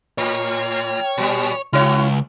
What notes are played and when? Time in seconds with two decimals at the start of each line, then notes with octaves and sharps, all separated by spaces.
0.18 A2 C#5
1.18 A#2 G3
1.73 C#2 E4 F#4 C#5